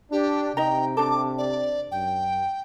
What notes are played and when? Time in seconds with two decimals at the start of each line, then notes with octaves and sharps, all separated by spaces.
0.12 D4 G4
0.57 C3 D#4 D#5 G5 A#5
0.97 D4 A4 D6
1.38 D5
1.92 F#2 G5